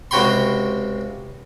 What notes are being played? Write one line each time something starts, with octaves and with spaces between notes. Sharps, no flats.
C#2 C3 F#4 G5 B5 C6